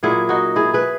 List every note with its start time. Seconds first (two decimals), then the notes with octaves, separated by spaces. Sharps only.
0.03 A#2 F#3 E4 G#4
0.29 D#4 F#4
0.56 E4 G#4
0.73 G#4 B4